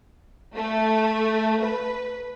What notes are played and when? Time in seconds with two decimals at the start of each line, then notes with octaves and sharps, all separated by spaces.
0.55 A3
1.63 B4